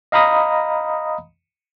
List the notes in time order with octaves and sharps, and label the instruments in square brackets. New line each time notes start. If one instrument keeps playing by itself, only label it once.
[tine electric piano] D#5 F5 A#5 B5 D#6